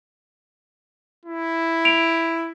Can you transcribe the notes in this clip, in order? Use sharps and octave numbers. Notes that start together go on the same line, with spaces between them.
E4
D7 F7